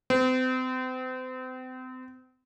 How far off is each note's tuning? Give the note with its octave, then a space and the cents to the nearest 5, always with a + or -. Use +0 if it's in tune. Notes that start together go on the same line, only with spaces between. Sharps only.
C4 -35